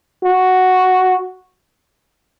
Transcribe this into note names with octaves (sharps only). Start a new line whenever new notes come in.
F#4